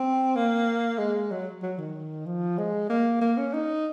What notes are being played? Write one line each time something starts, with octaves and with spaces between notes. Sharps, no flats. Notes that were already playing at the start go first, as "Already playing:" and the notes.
Already playing: C4
A#3
G#3
F#3
F#3
D#3
F3
G#3
A#3
A#3
C#4
D#4